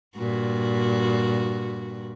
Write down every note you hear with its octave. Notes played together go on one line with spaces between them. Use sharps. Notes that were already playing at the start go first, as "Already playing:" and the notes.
G2 A#2 F#4